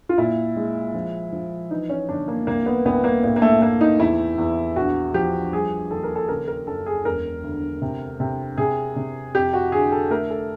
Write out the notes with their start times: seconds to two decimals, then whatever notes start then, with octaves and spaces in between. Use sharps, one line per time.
0.09 F4
0.18 A#2 E4
0.56 G#3
0.94 F3
1.32 F3
1.71 E3 D#4
1.89 C#4
2.08 G1 D4
2.28 A#3
2.47 C2 A#3
2.66 B3
2.85 C2 B3
3.04 A#3
3.24 A2 A#3
3.36 A#3
3.42 A3
3.61 A3 A#3
3.81 D#4
4.00 E2 E4
4.38 E2
4.76 A#1 F#4
5.14 F3 G4
5.52 G3 G#4
5.91 D#2 A4
6.03 A#4
6.15 A4
6.28 C#3 A#4
6.47 A#4
6.67 F#2 A4
6.86 G#4
7.05 E1 A#4
7.43 D2
7.82 C3
8.20 C3
8.58 C3 G#4
8.96 C3
9.34 F2 G4
9.53 F#4
9.72 D3 G#4
9.92 A4
10.10 A3 A#4
10.30 A4